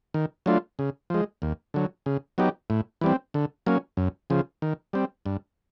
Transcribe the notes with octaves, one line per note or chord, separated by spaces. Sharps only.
D#3
F#3 A3 D4 F4
C#3
F3 G#3
D#2
D3 F#3
C#3
F#3 B3 D#4 G4
A2
E3 G3 C4
D3
F#3 A#3 C#4
F#2
C#3 F3
D#3
G3 C4
G2